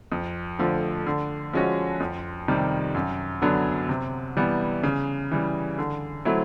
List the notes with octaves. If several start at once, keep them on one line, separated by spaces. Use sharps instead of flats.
F2
D3 F3 A3
D3
F3 G#3 C#4 F#4
F2
C3 D#3 G3
F#2
D3 F#3 B3 D4
C3
E3 G3 B3
C#3
E3 G3
D3
F#3 A3 C4 E4